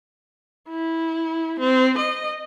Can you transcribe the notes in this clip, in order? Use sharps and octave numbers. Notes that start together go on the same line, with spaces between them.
E4
C4
D#5